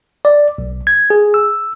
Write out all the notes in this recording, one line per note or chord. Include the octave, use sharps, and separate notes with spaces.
D5
B1
G#6
G#4
E6